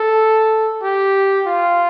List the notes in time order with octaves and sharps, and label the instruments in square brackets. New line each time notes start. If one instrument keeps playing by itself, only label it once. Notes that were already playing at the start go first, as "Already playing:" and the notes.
Already playing: [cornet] A4
G4
F4